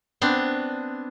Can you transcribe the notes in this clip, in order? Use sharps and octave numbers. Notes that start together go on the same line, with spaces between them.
B3 C4 D4